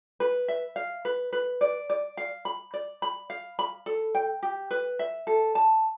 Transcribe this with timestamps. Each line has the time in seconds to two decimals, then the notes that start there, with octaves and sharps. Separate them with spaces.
0.20 B4
0.48 E5
0.76 F5
1.05 B4
1.33 B4
1.61 D5
1.90 D5
2.17 F5
2.45 B5
2.74 D5
3.02 B5
3.30 F5
3.59 B5
3.86 A4
4.15 G5
4.43 G4
4.71 B4
4.99 E5
5.27 A4
5.55 A5